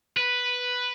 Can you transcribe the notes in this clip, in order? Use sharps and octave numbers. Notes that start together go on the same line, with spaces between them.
B4